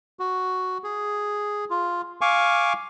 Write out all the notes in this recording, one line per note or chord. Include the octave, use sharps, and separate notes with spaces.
F#4
G#4
F4
F5 G#5 C#6 D6